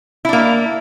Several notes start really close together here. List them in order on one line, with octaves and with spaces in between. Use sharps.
E4 D4 A#3